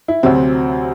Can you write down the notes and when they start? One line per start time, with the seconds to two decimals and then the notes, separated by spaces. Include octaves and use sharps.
0.08 E4
0.23 D2 C3 F#3 C4